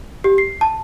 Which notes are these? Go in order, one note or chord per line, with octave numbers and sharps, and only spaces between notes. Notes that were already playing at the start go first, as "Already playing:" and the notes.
G4
C7
A5